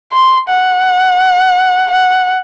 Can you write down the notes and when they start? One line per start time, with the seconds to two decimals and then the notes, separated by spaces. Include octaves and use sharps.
0.13 C6
0.49 F#5
1.91 F#5